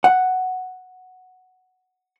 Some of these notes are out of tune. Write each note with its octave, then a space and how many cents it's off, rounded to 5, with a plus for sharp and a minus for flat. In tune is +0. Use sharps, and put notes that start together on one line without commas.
F#5 +0